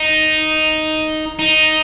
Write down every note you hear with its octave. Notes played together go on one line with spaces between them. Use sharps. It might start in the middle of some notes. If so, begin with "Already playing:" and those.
Already playing: D#4
D#4